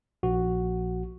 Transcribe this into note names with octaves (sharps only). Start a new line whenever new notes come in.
A#1 F#4